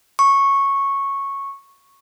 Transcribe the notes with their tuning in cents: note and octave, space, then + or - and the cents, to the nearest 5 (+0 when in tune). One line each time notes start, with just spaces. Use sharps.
C#6 -10